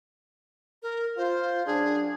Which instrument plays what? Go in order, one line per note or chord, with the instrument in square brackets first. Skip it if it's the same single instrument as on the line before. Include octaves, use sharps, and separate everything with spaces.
[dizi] A#4
[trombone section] F4 [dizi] C5
[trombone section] F#2 D4 [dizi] G#4